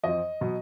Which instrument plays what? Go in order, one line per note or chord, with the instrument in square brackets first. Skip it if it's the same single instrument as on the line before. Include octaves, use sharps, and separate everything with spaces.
[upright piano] F2 F3 D#5
B2 F#3